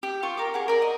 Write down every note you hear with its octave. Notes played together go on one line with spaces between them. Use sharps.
G4
F4 C#6
A#4 F5 D6
G#4 F#5
A#4 D5
D#5